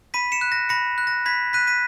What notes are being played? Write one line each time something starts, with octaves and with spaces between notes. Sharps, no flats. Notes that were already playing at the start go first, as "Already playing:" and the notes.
B5 B6 D#7
C#7 E7
F#6
A#6
B5 A#6 C#7
F#6
A#6
B5 G#6 B6
F#6 B6 D#7
B6 D#7